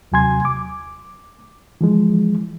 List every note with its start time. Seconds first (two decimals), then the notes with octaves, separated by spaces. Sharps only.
0.12 D#2 C3 F#3 G#5 C6 G#6
0.45 D6
1.81 E3 F3 G#3